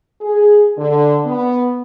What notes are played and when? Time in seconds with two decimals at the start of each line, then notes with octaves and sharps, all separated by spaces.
0.21 G#4
0.78 D3
1.26 B3